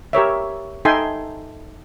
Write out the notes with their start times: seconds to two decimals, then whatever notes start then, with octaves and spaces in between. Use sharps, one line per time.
0.13 G4 A#4 C#5 E5
0.85 D#4 A4 E5 G5 G#5 C6